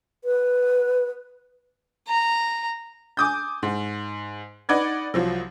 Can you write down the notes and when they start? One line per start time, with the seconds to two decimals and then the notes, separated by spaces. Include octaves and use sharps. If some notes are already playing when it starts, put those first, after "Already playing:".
0.24 B4
2.08 A#5
3.17 G#5 D6 D#6 G6
3.63 G#2
4.69 D#4 B4 D5 F#5 G#6
5.14 C2 F3 F#3